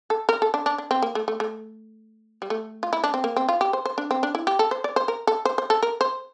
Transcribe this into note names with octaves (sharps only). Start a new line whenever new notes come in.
A4
A#4
A4
D4
D4
D4
C4
A#3
A3
A3
A3
G3
A3
F4
E4
D4
C4
A#3
C4
F4
G4
C5
C5
D4
C4
D4
E4
G4
A4
C5
D5
C5
A#4
A4
C5
C5
A4
A#4
C5